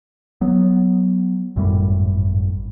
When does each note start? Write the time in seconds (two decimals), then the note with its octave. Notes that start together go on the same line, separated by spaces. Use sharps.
0.41 F#3 B3
1.56 G#1 F#2 A2 G3